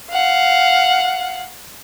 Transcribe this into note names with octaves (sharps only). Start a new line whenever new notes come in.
F5 F#5